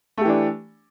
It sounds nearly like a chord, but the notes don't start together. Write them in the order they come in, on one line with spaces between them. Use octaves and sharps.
A3 G4 E3 D4